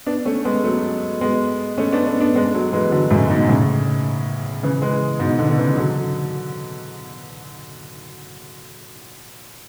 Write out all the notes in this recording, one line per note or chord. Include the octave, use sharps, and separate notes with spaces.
B3 D4
A3 C#4
G#3 B3
F#3 A3
G#3 B3
A3 C#4
B3 D4
B3 D4
B3 D4
G#3 B3
F#3 A3
E3 G#3
D3 F#3
F#2 A2
G#2 B2
A2 C#3
C#3 E3
E3 G#3
G#2 B2
B2 D3
D3
C#3 E3
D3 F#3